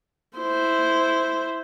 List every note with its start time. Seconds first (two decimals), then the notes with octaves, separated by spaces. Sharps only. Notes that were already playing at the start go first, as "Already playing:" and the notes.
0.37 E4 C5